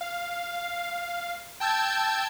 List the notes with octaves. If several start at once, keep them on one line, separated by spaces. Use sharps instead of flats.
F5
G5 A5 E6 G6 G#6